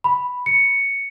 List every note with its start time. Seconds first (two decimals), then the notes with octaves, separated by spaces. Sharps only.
0.04 B5
0.46 C#7